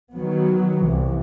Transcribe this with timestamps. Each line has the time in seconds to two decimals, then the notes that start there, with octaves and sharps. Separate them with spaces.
0.15 D#3 F#3 B3
0.83 C2 E3